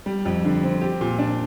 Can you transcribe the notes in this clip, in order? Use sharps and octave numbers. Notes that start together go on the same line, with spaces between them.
G3
F2
D3
C4
G4
A#2
D4